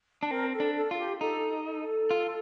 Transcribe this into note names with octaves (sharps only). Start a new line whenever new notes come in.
D4
C4 A#4
A4
D4
A4
F4 A4
G4
D#4 A4
A4
F4